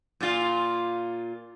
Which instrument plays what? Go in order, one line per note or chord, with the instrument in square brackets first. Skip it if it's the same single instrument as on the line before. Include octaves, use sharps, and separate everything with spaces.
[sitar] A#2 F4